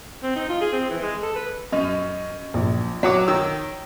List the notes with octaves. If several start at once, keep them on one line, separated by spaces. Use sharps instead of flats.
C4
D#4
F4
G#4
C4
E3
G#3
A4
B4
F#2 D#5
A#1
F#3 C#5 F#5 D6
D#3 E6